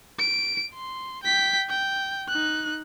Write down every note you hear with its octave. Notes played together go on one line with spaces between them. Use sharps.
D7
C6
G5 B6
G5
D#4 F#6